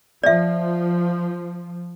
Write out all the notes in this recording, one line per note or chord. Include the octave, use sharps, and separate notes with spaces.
F3 D5 E5